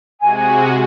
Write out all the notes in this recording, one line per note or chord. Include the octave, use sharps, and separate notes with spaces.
C3 G#3 F#4 G#5